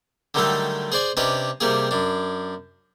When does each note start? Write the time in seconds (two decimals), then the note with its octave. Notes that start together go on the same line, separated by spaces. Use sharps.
0.34 D3 D#3 F#3 G3 A3 A4
0.92 G#4 C5 D5 G#5
1.17 C3 C#4 D4 B4 D#5
1.61 C3 G3 A#3 G#4
1.91 F#2 D4